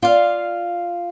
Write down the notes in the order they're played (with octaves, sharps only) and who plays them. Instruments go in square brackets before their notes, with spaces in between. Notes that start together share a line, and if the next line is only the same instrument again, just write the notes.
[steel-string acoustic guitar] F4 F5 [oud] D5